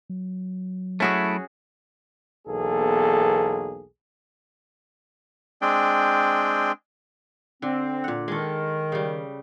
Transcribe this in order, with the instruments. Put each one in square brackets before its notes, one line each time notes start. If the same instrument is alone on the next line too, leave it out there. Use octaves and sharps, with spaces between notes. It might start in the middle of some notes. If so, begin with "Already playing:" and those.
[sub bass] F#3
[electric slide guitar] A3 E4 [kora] C#4 F#4 G#4
[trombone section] B1 E2 A#3 G#4 A4
[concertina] G#3 C4 D4 G5
[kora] D3 [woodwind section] C4
[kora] A#2 F#5
[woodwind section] D#3 [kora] G#3 A4
[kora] C#3 G3